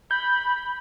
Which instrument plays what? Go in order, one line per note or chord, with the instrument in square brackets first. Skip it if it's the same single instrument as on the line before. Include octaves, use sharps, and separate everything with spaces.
[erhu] B5 [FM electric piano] G6